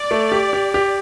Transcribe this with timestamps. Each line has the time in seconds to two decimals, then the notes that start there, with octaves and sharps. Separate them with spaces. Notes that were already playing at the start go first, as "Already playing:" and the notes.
Already playing: D5
0.11 A3
0.32 G4
0.53 G4
0.74 G4